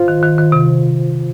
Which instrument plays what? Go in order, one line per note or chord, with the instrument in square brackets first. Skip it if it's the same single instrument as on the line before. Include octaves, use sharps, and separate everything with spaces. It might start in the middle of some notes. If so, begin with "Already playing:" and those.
Already playing: [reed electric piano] F4 C5
[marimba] D#3
D#3
D#3
C3